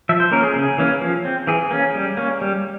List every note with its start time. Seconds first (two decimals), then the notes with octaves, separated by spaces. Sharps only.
0.09 F3 E5
0.20 C5
0.31 A#3 C#4 A#4
0.43 G#4
0.55 C#3
0.78 E3 A#3 C#4
1.01 F3
1.25 C4
1.47 E3 G#4
1.71 A#3 C#4
1.94 G3
2.17 A#3 C#4
2.41 G3